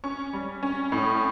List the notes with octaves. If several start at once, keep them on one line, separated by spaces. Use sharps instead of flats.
C#4 C#6
G3
C#4
A2